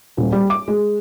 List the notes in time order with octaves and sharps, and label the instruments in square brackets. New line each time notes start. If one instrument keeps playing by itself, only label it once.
[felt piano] D#1
G3
D6
G#3